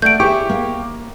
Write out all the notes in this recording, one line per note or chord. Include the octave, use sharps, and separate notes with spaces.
A3 D5 F#5 G6 D7
E4 G4 G#4 C5 G5 C#6
A#3